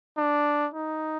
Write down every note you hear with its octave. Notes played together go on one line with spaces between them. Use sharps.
D4
D#4